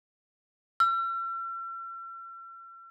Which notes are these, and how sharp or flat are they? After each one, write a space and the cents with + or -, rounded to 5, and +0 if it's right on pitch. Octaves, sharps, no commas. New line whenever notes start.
E6 +45